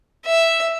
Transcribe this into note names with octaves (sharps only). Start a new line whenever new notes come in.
E5